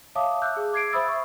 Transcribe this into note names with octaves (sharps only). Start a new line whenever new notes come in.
C#5 E5 F5 A5 D6 D#6
E5 D6 E6 F#6 G6
G#4
D6 G#6 C7 D7
C5 E5 B5 D#6 E6 A6
E5 C#6